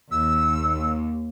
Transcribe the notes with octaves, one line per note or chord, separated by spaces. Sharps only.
D#2 E6